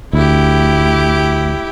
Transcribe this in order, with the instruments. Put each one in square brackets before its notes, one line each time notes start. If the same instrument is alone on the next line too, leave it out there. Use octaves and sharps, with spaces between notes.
[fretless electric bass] D2 [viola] E4 G4